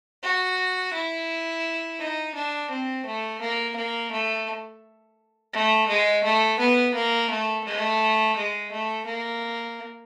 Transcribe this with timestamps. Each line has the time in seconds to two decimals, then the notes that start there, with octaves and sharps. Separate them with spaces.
0.23 F#4
0.94 E4
1.99 D#4
2.35 D4
2.71 C4
3.06 A3
3.41 A#3
3.76 A#3
4.12 A3
5.53 A3
5.88 G#3
6.24 A3
6.59 B3
6.95 A#3
7.30 A3
7.65 A3
8.37 G#3
8.72 A3
9.06 A#3